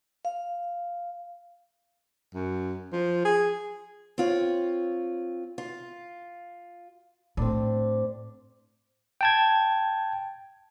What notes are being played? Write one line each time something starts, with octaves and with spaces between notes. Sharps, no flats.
F5
F#2
F3
G#4
C4 F4 C#5
F4
A2 C4 D4
G5 A5 G#6